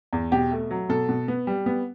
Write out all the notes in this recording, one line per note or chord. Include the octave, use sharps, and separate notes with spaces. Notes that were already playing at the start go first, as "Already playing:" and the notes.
E2
B2 G4
A3
F#3
B2 A4
B2
B3
G3
B3